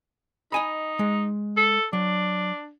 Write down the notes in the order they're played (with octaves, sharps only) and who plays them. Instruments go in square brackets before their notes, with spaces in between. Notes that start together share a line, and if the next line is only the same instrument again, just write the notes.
[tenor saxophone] D#4 [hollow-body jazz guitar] D#5 G#5 B5
[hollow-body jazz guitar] G#3
[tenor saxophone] A4
[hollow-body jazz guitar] F#3 [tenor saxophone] D4